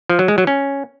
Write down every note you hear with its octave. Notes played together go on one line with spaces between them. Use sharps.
F3
F#3
G#3
F#3
C#4